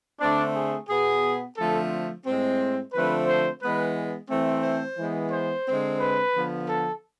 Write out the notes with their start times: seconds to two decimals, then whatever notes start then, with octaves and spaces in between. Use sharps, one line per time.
0.21 D3 A3 C4 D4
0.55 G#4
0.89 B2 B3 G#4
1.57 D3 F3 A3 C4 A4
2.26 A2 G#3 C4
2.93 D3 F3 A3 C4 B4
3.27 C5
3.61 E3 G#3 B3 B4
4.30 E3 A3 C4
4.63 C5
4.98 E3 G#3 B3
5.32 C5
5.66 D3 G#3 C4
6.00 B4
6.34 D3 F3 B3
6.69 A4